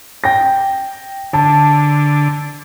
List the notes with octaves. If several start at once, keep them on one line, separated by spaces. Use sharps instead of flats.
G5 A#6
D3 A5